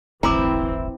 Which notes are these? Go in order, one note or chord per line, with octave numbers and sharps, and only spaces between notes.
D1 G1 E3 C4 E4 A#5 B5 D6